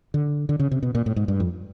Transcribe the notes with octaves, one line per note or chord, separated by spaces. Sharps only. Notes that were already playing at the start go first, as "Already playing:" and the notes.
D3
D3
C#3
C3
B2
A#2
A2
G#2
G2
F2